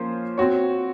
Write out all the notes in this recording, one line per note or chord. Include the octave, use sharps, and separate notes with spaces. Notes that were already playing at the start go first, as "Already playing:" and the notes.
Already playing: F3 A#3 C#4 F4 C5
C4 F#4 C#5